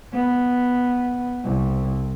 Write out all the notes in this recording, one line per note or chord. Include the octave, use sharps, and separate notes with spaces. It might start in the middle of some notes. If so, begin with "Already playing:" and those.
B3
C2